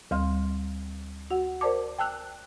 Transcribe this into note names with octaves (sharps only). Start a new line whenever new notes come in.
D2 G3 F5 C6 F6
F#4 F#5
A#4 C5 D5 A5 D6
G5 A5 E6 F#6